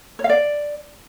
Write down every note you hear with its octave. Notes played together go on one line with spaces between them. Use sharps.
C#5
F5
D5